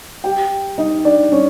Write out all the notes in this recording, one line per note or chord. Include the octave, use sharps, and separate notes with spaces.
G4 G5
D#4 D#5
D4 D5
C#4 C#5